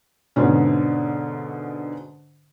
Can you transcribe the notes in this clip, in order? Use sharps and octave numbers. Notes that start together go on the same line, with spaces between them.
G#2 B2 D3 C#4